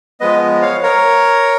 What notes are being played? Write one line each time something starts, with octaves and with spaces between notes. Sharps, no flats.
F3 G#3 B3 B4 D#5
C#5 F5
A#4 C#5